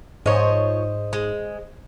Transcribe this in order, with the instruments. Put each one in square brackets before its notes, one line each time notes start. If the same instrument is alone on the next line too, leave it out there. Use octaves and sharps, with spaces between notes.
[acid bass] G#2 [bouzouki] F3 C#5 [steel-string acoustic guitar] C5 D#5
[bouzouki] G#3